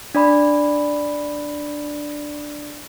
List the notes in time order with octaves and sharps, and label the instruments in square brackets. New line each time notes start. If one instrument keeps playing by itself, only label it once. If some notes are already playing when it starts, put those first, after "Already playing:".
[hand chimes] D4 D5 B5